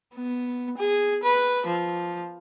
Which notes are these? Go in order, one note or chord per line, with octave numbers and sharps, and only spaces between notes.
B3
G#4
B4
F3